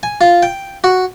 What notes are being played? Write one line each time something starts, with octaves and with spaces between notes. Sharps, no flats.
G#5
F4
G5
F#4